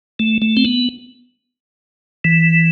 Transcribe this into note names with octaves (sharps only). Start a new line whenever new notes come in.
A3
A3
C4
B3
E3